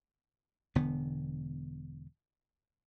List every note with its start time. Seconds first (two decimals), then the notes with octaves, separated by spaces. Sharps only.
0.75 E1 D3 B3